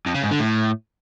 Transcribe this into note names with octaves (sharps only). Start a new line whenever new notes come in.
F2
C#3
G#2
D3
A2